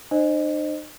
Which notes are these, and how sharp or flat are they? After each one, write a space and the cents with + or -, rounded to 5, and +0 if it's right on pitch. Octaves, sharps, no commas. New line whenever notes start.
D#4 -45 C5 +15 D#5 -20